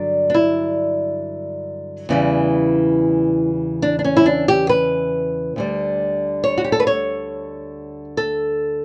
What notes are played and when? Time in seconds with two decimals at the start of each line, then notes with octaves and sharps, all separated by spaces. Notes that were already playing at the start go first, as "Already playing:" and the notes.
Already playing: G2 D3 F#3 D5
0.30 D4
0.34 E4
2.09 E2 C#3 E3 G3
3.82 D4
3.99 D4
4.04 C#4
4.17 E4
4.26 D4
4.48 G4
4.69 B4
5.56 D2 D3 G3
6.44 C#5
6.58 F#4
6.64 G4
6.72 A4
6.80 B4
6.87 C#5
8.17 A4